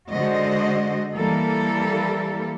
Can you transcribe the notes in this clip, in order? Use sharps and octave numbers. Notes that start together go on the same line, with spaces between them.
D3 G#3 F#4 C5 D#5
E3 G3 A#3 A4